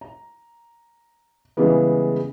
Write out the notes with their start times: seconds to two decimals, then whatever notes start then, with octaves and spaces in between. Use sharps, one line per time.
0.01 A#5
1.57 C#3 E3 G3 G#3 B3